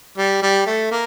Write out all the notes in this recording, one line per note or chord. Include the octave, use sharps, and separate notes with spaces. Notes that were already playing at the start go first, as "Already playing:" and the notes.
G3
G3
A3
A#3